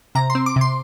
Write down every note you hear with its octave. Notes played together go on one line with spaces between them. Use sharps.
C3 A#5
C6
C4
D6
C3
C6